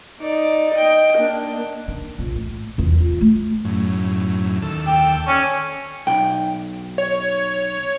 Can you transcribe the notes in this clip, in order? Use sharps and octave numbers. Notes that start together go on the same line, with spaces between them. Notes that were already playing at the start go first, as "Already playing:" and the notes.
D#4 D5
D#5 G5
A#3 D4
D#3
A#1
A2
E2
F4
A3
F#2 A2
D#2 A4
G5
C#4 A4 C#5 D5
B1 G5
C#5